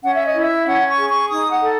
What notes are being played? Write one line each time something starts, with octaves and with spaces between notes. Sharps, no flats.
C#4 F#5
E5
D#5
E4
E5
C#4 F#5
C#6
G#4
C#6
D#4 D#6
F#5
A4